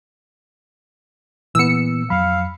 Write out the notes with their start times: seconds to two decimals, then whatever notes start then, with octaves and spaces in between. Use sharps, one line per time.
1.55 A#2 E3 B3 E6 C#7
2.10 F2 F#3 F5 B5